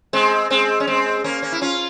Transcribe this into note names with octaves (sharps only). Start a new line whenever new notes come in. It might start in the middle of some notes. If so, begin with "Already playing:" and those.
G#3 C4
G#3 C4
C#4
G#3 C4
A#3 C#4
C#4
E4
C#4 F4